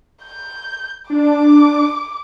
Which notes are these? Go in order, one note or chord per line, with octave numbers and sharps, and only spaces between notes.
G6
D4 D6